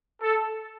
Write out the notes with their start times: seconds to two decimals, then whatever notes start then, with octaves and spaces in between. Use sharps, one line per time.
0.22 A4